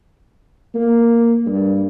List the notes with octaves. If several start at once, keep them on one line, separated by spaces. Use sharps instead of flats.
A#3
G2